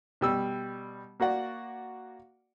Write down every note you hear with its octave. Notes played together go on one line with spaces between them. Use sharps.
B2 G3 E6
A#3 F#4 D5 F#5